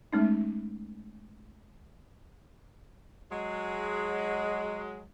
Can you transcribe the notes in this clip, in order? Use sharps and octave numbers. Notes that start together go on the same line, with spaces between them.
G#3 A3 C#4 D#4
F#3 G#3